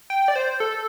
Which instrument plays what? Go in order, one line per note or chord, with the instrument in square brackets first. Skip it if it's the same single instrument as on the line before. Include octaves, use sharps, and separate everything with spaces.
[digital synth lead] G5
D5
C5
A4